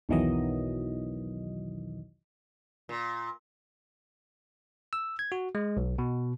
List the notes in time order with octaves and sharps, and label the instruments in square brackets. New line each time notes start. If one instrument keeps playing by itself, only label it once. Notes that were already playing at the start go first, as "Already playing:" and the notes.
[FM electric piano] B1 E2 D#3 E3 F#3 D#5
[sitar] A#2
[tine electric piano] E6
G#6
F#4
G#3
B1
B2